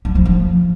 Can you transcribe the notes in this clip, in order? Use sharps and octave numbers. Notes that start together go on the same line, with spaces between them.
G3
F3
F3